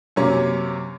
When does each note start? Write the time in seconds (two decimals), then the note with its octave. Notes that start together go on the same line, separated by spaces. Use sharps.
0.16 F#2 C3 A#3 C#4